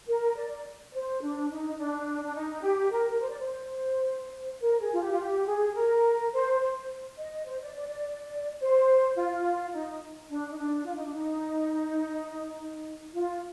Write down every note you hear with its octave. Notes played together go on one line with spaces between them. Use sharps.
A#4
D5
C5
D4
D#4
D4
D4
D#4
G4
A#4
C5
D5
C5
A#4
G#4
F4
G4
F4
G4
G#4
A#4
C5
C5
D#5
C5
D5
D5
D5
C5
F4
D#4
D4
D#4
D4
F4
D#4
D4
D#4
F4